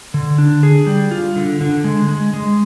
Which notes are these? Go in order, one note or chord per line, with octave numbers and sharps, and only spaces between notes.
D3
D4
G#4
G3
F4
D3
D3
G#3
G#3
G#3